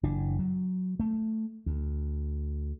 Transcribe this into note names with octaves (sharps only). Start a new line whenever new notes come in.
F#1 E3 D4
F#3
A3
D2